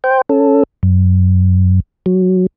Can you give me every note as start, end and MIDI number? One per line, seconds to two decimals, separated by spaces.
0.04 0.21 72
0.04 0.21 79
0.29 0.63 61
0.29 0.63 69
0.83 1.80 42
2.06 2.46 54